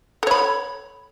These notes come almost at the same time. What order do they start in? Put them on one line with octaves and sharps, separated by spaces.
A4 C#5 B5